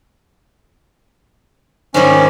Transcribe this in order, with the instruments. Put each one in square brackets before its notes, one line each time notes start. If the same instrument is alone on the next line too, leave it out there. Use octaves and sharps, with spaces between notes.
[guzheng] G#2 D#3 G3 [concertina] C#4